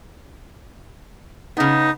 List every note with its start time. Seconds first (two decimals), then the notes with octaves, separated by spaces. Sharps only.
1.57 C#3 B3 D#4